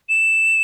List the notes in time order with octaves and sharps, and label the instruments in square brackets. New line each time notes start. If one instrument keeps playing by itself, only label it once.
[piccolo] E7